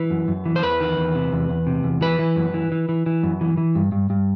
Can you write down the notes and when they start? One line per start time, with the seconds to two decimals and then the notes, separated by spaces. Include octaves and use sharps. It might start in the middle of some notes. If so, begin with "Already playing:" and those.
Already playing: E3 B4
0.10 F#2
0.28 F#2
0.45 E3
0.56 C5
0.63 E2 B4
0.80 D#3
0.97 E2
1.15 C3
1.32 E2
1.49 E2
1.67 C3
1.84 E2
2.01 E3 B4
2.19 E3
2.36 F#2
2.54 E3
2.72 E3
2.89 E3
3.06 E3
3.23 F#2
3.41 E3
3.57 E3
3.75 G2
3.92 G2
4.10 G2